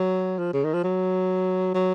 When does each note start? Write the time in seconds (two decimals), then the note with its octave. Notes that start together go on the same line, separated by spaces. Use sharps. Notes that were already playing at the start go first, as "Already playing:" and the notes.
Already playing: F#3
0.39 F3
0.54 C#3
0.64 D#3
0.74 F3
0.84 F#3
1.74 F#3